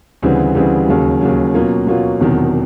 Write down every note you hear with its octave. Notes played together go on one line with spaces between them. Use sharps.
D2 C#3 E3 G3 C4
D2 C#3 E3 G3 C4
D#2 C#3 F#3
D#2 C#3 F#3
B2 F#3 A#3 C#4 F4
B2 F#3 A#3 C#4 F4
E1 E2 C3 D#3 F#3